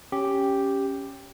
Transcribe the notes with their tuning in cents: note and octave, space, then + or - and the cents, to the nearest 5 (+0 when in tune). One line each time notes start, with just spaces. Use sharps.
C#4 +0 G4 +0